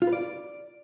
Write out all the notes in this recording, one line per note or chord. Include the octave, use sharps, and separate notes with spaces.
F4
B4
D5